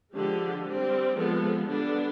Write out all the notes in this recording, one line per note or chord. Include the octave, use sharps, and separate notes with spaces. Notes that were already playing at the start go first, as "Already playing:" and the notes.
D3 F3 G#3 G4
G3 C4
F3 G#3 B3 A4
D3 G3 B3 D4